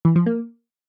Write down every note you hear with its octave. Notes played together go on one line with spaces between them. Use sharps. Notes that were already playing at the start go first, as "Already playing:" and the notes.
E3
F3
A#3